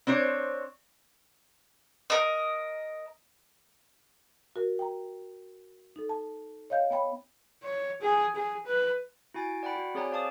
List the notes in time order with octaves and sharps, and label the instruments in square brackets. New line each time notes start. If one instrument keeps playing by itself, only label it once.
[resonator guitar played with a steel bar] C4 D4 C5 C#5
[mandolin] A#4 D#5
[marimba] F#4 A#4
G5 A#5
D#4 A4
A5
C#5 D#5 F5 G6
B3 C#5 G5 B5
[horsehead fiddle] C#5
G#4
G#4
B4
[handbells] E4 F#4 G#5 A6 D7
D5 F#5 G5 B5
F#4
C4 G#4 C#5 D5 G#5 A#5
C5 D5 F5 A5 D6 D#6